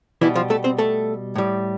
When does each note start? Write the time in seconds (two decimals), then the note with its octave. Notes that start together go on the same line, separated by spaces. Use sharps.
0.21 B2 E3 G3 E4
0.35 F3 F4
0.50 A3 A4
0.64 C4 C5
0.78 A3 A4
1.35 A2 G3